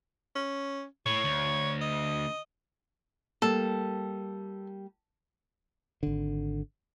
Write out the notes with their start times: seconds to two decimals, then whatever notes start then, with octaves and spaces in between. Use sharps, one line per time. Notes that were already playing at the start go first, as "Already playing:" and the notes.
0.36 C#4
1.06 A2 C#5
1.24 D2
1.81 D#5
3.42 G3 A#3 A4
6.03 G#1 D3